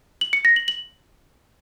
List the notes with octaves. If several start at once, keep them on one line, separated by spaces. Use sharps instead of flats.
F#7
C#7
A#6
F#7
F#7